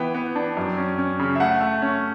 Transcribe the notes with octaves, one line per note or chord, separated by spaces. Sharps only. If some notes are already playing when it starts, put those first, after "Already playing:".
Already playing: E3 B3 G5
B3
D4
F#2
C#4
C#4
C#3
E5
A3 F#5
A3
C#4